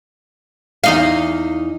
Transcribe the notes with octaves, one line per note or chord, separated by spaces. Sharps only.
E2 D#4 F5